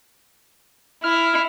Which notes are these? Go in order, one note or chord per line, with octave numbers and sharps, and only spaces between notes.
E4 F6